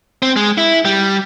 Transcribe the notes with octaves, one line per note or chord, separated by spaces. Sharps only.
C4
G#3
E4
G3